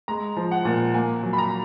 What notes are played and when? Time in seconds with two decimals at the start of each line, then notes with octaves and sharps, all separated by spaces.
0.08 G#3 A#5
0.36 F3
0.51 F#5
0.65 A#2
0.94 A#3 G#5
1.23 F#3
1.33 B5
1.38 A#5